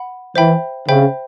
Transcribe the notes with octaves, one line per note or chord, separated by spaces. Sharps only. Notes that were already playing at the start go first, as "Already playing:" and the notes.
Already playing: F#5 B5
E3 C5 E5 G5 B5
C#3 C5 E5 G5 B5